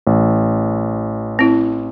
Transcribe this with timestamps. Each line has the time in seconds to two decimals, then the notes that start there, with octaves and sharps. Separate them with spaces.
0.07 A1
1.39 C4 E4